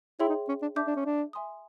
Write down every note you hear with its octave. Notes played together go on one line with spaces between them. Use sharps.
E4 G#4 C#5 E5 G5 C6
D#4
C#4
D4
D4 E5 A5 D6 G6
D4
C#4
D4
E5 G#5 C6 D#6